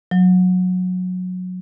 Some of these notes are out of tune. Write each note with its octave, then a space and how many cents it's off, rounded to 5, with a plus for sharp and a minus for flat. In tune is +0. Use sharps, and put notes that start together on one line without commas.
F#3 -20